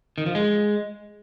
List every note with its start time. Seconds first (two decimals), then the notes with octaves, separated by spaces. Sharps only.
0.18 D#3
0.26 F3
0.35 G#3